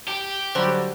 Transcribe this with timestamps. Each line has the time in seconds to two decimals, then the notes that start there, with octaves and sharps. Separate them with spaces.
0.08 G4
0.55 D3 F#3 G3 C5 C6